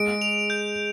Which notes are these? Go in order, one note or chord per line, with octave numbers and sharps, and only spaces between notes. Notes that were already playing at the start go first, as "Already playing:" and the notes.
Already playing: G#3 D7
F7
G6